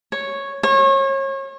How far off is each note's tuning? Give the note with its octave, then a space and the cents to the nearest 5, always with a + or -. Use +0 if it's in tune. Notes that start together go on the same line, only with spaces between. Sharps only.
C#5 -5
C#5 -35